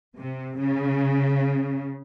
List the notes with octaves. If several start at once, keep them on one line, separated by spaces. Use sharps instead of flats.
C3
C#3